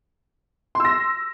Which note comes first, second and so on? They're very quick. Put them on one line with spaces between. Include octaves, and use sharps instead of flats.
C6 E6 A#6